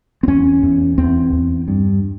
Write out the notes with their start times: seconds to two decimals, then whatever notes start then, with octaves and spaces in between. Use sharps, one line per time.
0.23 C4
0.28 E2 C#4
0.63 E2
0.98 E2 C4
1.33 E2
1.68 G2